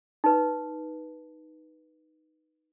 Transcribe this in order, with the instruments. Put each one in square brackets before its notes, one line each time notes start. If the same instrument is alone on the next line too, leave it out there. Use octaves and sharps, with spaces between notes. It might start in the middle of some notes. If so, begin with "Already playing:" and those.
[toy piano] D#4 B4